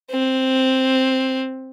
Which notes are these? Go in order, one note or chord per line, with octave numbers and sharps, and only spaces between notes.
C4